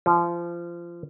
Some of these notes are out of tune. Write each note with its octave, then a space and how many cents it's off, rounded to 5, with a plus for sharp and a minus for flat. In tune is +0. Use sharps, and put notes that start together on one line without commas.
F3 -25